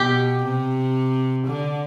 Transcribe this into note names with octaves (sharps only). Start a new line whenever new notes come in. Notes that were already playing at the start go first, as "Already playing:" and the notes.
Already playing: B2 G4
C3
D3